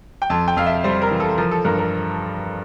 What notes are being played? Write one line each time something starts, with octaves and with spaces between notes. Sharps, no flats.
G5
F2 A5
G5
F2 F5
E5
G3 C5
A#4
E3
A4
F3 A#4
A4
G2 A#4
A#4